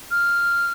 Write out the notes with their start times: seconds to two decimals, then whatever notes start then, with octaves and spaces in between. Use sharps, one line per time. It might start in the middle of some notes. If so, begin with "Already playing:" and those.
0.11 F6